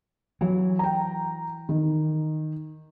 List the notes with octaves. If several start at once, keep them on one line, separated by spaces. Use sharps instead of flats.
E3 F#3
G5 A#5
D#3